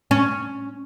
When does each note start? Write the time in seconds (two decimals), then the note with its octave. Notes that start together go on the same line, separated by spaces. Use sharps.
0.11 C#4